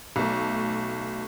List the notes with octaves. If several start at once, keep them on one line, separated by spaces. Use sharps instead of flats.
B1 A3